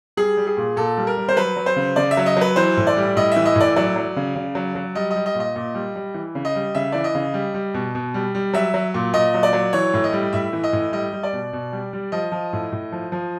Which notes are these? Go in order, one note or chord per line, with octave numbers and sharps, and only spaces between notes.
G3 G#4
G3
G#4
A#2
A#2 A4
G3
A#4
G3
C5
F#3 B4
F#3
C5
C#3
C#3 D5
E5
F#3
D#5
F#3 B4
E3 C5
A2
D5
G3
A2 D#5
E3 E5
D#5
A2 D5
F#3 D5
F#3
C#3
C#3
F#3
F#3
G3 D#5
D#5
G3
D#5
A#2
D#5
A#2
G3
G3
E3
C#3
D#5
G3
C#3 E5
E3 D5
D#5
C#3
G3
G3
B2
B2
G3
G3
F#3 E5
F#3
A#2
A#2 D#5
F#3
D5
F#3
E3 C#5
A2
D#5
G3
A2 E5
E3
D#5
A2
G3 D#5
G3
D5
B2
B2
G3
G3
F3 D#5
F3
A2
A2
F3
F3